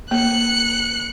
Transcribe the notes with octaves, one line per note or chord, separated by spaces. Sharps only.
A#3 F#6 C#7